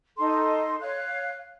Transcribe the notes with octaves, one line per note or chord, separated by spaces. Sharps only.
D#4 A4 C6
C#5 F5 F#6